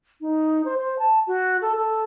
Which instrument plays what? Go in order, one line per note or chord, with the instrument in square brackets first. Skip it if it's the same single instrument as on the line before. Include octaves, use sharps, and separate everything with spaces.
[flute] D#4
C5
C5
A5
F#4
A4
A4